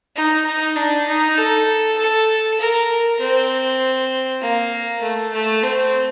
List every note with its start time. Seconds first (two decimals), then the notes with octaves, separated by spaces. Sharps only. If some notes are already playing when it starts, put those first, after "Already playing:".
0.15 D#4
0.46 D#4
0.76 D4
1.07 D#4
1.37 A4
1.98 A4
2.59 A#4
3.19 C4
4.41 A#3
5.02 A3
5.32 A3
5.63 C4